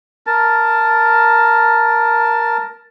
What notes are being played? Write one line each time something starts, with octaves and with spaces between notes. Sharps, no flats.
A#4 A5